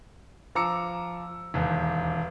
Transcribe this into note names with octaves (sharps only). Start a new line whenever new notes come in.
F3 A#5 D6 E6 C#7
E1 D#2